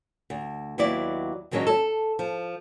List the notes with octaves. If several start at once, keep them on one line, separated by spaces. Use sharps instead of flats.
D2
D#2 F#3 B3 E4 D5
G#2 D#3 F#3 G#3 C#4 D4
A4
F3